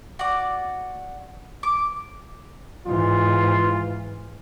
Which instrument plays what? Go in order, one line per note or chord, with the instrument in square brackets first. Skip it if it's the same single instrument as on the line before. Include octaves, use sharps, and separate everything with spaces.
[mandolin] F#4 D5
D6
[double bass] G#2 E3 [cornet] F4